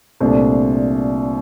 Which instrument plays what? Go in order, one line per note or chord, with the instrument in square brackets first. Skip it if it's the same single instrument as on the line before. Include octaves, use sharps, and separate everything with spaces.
[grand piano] C2 A#2 A3 D4